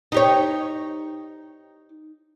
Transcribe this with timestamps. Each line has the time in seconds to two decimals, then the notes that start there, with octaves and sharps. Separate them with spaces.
0.12 D#4 G4 C#5